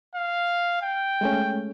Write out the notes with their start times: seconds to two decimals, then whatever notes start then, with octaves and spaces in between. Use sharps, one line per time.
0.16 F5
0.82 G5
1.21 G#3 A3 C#4